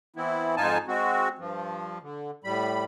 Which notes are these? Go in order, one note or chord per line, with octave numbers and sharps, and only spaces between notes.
E3 B3 C4 E4
F2 G#2 D#4 F4 G#5 A5
G#3 C4 F#4
G2 F3
D3
A2 G3 B5